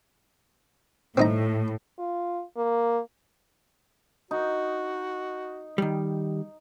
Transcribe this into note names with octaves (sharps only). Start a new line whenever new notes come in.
A2 C4 D#4 A#5
F4
A#3
D#4 F#4
D#3 G3